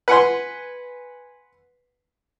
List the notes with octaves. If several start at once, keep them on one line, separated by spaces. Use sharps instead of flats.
B4 F#5 G#5 C6